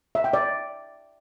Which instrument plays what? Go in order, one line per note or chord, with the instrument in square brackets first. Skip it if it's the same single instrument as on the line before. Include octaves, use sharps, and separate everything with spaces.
[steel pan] E5
G5
D5